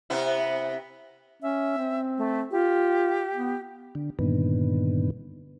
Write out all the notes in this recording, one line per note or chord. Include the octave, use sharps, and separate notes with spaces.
C3 B3 E4
C#4 E5
C4
A3
F4 G4
B3
D3
G2 A#2 D3 D#3 B3